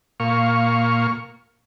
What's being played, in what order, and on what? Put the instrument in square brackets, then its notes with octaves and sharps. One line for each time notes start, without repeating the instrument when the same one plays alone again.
[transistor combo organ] A#2 F5 C#6